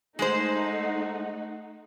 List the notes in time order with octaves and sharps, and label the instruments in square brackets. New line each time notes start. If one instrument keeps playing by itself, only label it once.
[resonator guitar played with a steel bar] G#3 G#4 C5 [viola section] A3 D#4 F#5